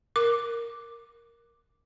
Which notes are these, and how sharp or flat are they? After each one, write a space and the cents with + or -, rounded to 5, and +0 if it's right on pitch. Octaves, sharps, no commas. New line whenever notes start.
A#4 +0 D6 +0